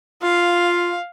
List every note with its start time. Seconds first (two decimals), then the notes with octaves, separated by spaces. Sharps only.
0.23 F4 F5